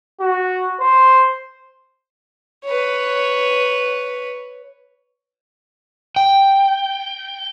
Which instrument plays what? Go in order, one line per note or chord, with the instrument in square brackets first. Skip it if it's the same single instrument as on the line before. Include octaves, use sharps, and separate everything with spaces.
[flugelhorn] F#4
C5
[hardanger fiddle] B4 C#5
[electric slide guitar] G5